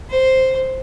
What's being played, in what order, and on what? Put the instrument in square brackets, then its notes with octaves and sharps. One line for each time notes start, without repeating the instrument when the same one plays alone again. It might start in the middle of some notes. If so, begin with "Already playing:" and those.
[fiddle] C5